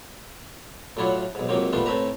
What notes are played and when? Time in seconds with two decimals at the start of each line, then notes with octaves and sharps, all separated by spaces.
0.97 A2 F#3 D4 E4 F4 F#5
1.35 B1 G#2
1.49 C#2 C3 F#3 A#3 C4
1.73 A#2 G3 A3 B3 D4 F4
1.86 A2 A3 C4 B4 A#5